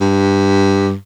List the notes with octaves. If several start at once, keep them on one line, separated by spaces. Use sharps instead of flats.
G2